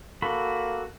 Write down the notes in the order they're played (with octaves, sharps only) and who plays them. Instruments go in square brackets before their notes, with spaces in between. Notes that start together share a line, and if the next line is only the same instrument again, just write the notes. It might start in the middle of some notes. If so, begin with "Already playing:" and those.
[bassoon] A#3 [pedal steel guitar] F#4 A4 B5